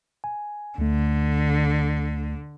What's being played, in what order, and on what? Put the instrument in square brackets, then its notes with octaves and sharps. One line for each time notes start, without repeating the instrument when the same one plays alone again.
[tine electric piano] G#5
[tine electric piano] D2 A3 [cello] D3